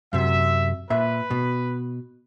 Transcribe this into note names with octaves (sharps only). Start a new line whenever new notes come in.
F#2 C3 E5
A#2 B4 E5
B2